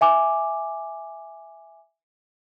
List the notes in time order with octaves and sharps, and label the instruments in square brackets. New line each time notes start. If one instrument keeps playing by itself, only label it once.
[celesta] E5 G#5 D6